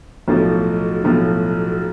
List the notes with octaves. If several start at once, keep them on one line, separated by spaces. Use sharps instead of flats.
B1 A2 F3 A3
B1 A2 F3 A3